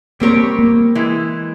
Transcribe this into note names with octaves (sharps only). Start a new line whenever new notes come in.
G3 A#3 C4 G4 A#4 C#5
A#3
E3 G#3 E4